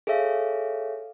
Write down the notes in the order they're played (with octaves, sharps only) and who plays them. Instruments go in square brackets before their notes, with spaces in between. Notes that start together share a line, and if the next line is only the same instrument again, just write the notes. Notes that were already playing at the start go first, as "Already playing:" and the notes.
[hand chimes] G#4 A4 C#5 E5 F5